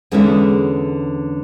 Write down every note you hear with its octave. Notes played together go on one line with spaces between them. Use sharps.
E2 D3 G#3 C#4 E4